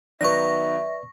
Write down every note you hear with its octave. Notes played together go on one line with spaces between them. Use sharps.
D#3 F#3 B3 B4 D5 E5 C#6 A#6